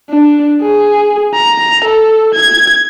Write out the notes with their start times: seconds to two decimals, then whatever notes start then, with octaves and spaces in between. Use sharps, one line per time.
0.10 D4
0.62 G#4
1.35 A#5
1.85 A4
2.34 G#6